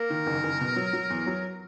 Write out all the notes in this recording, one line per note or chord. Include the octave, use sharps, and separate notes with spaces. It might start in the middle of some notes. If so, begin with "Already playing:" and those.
Already playing: A#3 A#4
D#3
F#1
F#1
B2
F#3
F#3
E2
F#3